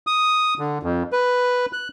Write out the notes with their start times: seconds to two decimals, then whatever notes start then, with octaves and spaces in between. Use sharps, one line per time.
0.07 D#6
0.59 D3
0.83 F2
1.12 B4
1.73 F#6